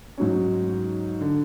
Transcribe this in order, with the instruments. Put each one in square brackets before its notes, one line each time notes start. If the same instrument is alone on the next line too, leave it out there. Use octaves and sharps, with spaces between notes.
[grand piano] G#2 F#3 C#4
D3